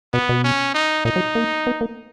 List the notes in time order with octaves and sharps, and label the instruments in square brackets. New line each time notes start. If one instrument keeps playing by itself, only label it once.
[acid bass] B2 [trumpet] B3
[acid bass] B2
[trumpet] C#4
D#4
[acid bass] A#2 [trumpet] D#4
[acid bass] F#3
A#3
B3
A#3